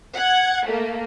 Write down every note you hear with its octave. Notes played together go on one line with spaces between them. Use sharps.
F#5 G#6
A3 A#3